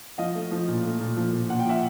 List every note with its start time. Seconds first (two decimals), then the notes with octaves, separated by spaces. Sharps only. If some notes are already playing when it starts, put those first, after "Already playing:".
0.18 F3 D#5 F5
0.35 A3
0.51 F3
0.68 A#2
0.84 A3
1.01 A#2
1.17 F3
1.33 A#2
1.49 A#2 F#5
1.59 G5
1.65 F3 E5 F#5